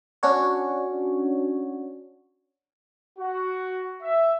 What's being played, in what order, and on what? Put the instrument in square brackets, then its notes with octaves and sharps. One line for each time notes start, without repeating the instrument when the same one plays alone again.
[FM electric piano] C#4 D4 F#4 C#5
[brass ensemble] F#4
E5